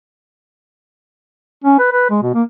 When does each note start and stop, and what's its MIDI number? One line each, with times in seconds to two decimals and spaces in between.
1.64 1.77 61
1.79 1.90 71
1.92 2.07 71
2.10 2.18 56
2.22 2.32 47
2.34 2.43 58